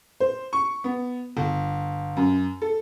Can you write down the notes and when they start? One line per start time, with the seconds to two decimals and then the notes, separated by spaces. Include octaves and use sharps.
0.20 C5
0.53 C#6
0.84 B3
1.37 G1
2.17 F#2
2.62 A4